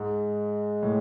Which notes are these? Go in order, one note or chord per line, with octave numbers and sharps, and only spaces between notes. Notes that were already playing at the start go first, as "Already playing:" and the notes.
Already playing: G#2 G#3
A2